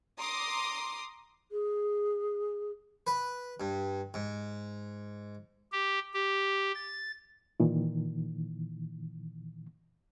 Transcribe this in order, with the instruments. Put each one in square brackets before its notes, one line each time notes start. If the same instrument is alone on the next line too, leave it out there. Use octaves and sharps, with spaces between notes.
[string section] A#5 C6 D6 D#6
[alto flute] G#4
[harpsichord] B4
G2
G#2
[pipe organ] G4
G4
A6
[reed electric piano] A#2 D#3 E3